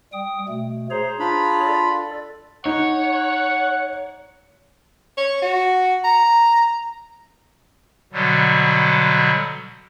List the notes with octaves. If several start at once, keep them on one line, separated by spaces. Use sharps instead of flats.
G3 G5 D#6
B2 A3
G#4 C5 C#5 A#5
D4 F4 B5
A4 D5
D#4 C#5 F#5
C#5
F#4
A#5
B2 D3 F#3 G3